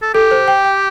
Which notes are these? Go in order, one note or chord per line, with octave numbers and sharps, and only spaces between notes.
A4
G4 A4
C5
G5
G5